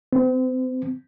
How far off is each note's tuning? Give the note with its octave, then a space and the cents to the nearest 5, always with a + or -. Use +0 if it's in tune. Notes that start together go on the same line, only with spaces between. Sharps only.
C4 -35